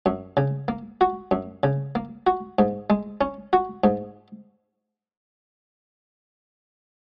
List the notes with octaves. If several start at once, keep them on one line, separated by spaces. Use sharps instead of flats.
F#2
C#3
A#3
F#4
F#2
C#3
A#3
F#4
G#2
G#3
C#4
F#4
G#2